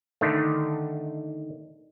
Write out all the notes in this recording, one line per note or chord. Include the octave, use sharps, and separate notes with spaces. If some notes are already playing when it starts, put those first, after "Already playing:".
D3 D#3 A3